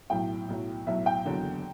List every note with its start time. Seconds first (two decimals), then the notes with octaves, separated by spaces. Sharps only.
0.10 B1 A2 F#3 G5
0.48 B1 A2 F#3
0.87 B1 A2 F#3 E5
1.06 G5
1.24 F#1 E2 D3 F#3